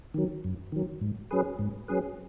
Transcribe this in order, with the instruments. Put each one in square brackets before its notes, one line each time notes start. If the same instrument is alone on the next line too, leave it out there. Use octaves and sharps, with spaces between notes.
[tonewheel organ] D#3 F#3
F#2
D#3 F#3
G#2
F#3 C#4 G#4 B4
G#2
F#3 C#4 G#4 B4